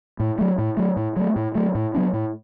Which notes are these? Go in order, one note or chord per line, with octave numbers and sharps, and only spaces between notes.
A2
F#3 A3
A2
F#3 A3
A2
F#3 A3
A2
F#3 A3
A2
F#3 B3 D4
A2